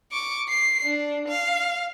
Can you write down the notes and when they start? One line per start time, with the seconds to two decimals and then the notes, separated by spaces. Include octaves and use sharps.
0.12 C#6 D6
0.49 C7
0.83 D4
1.28 F5